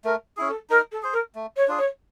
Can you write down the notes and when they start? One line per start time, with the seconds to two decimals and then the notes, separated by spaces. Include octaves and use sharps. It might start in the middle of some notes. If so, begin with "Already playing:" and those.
0.04 A3 A#4
0.37 C#4 E4 G#4
0.49 A4
0.70 D#4 A#4
0.91 A4
1.03 G#4 C5
1.13 A#4
1.35 A3
1.56 C#5
1.68 D4 F4 G#4
1.78 C#5